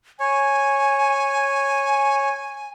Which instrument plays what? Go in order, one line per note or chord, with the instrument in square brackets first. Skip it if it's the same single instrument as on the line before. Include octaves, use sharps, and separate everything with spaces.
[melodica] C#5 [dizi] G#5